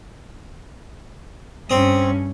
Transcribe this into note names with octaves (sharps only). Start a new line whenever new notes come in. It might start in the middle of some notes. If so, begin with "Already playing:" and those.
G2 C4 C#4 D#6